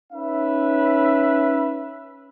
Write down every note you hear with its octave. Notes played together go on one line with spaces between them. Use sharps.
C#4 D#4 B4 E5